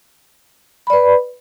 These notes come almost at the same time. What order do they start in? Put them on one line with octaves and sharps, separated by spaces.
B5 D5 B4